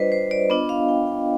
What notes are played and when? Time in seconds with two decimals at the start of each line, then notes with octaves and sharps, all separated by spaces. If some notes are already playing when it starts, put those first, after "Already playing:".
Already playing: G3 D4 F4 B4 C5 D5 D#5
0.12 C5
0.31 D5
0.50 B3 D4 F4 D#5
0.69 F5
0.88 G5
1.07 G5